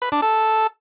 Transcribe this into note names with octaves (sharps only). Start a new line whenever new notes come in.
B4
D4
A4